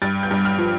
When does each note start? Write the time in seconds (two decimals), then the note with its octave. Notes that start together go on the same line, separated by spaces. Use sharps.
0.02 G2 A6
0.23 G6
0.31 G2
0.45 F6
0.58 F3